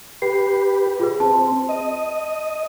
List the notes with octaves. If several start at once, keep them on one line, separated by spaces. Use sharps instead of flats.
G4 B4 C7
F4 G#4 B4
C4 A5
D#5